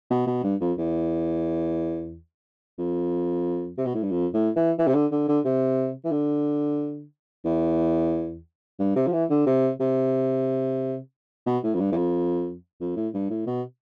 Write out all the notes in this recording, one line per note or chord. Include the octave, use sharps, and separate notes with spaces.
B2
B2
G2
F2
E2
F2
C3
B2
A2
G2
F2
A2
E3
E3
C3
D3
D3
D3
C3
E3
D3
E2
G2
C3
F3
E3
D3
C3
C3
B2
A2
F2
G2
E2
F2
F2
A2
G2
A2
B2